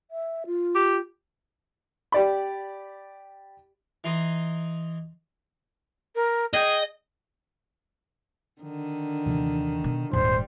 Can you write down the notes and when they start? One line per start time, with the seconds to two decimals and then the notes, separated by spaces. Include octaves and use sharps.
0.11 E5
0.46 F4
0.75 G4
2.12 G4 D5 B5
4.04 E3 D#4 C6 D#6
6.16 A#4
6.54 G#4 D#5 G5
8.62 D3 D#3
9.26 D#2 C3 E3
9.84 B2
10.13 D#1 D#2 G#2 G3 C5